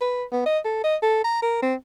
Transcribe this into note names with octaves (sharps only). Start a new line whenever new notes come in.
B4
B3
D#5
A4
D#5
A4
A#5
A#4
C4